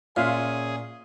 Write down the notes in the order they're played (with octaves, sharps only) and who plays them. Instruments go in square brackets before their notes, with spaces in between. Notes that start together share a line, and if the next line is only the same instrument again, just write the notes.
[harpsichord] A#2 [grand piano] C#4 E5 C6 [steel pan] F4 F5 [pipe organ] G#4